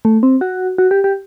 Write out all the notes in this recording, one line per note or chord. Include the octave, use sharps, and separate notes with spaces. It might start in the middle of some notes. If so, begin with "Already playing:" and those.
A3
C4
F#4
F#4
G4
G4